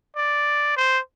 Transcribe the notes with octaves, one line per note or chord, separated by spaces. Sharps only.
D5
C5